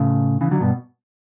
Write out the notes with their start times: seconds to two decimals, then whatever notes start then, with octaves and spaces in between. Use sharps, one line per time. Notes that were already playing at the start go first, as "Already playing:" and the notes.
Already playing: A2 C#3
0.41 C#3 E3
0.51 D3 F#3
0.61 G2 B2